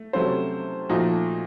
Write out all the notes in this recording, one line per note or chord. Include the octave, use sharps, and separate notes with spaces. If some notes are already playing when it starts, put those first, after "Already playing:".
Already playing: A3
C3 F#3 A3 C#4 A4 C5
A#2 F3 A3 D#4 F#4